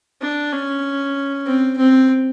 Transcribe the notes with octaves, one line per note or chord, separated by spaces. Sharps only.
D4
C#4
C4
C4